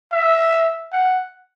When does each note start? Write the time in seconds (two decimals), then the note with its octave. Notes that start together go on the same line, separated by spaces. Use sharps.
0.12 E5
0.92 F#5